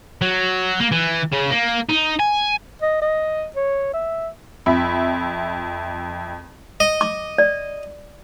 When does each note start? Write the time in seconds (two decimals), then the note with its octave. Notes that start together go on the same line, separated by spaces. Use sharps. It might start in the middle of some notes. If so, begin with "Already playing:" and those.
0.22 F#3
0.80 A#3
0.92 E3
1.33 C#3
1.51 A#3
1.89 D#4
2.19 G#5
2.82 D#5
3.01 D#5
3.56 C#5
3.94 E5
4.66 F2 E5 B5
6.80 D#5
7.01 D6
7.38 D5